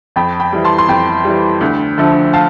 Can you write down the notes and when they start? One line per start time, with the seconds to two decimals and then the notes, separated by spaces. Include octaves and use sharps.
0.16 F2 G5 B5
0.40 G5 B5
0.53 E3 G3
0.64 A5 C6
0.78 C6
0.88 F2 G5 B5
1.25 E3 G3
1.61 D2
1.98 D3 F3 A3
2.33 F5 A5